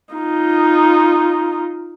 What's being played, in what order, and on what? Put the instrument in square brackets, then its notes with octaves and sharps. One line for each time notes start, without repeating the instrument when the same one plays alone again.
[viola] D#4 F4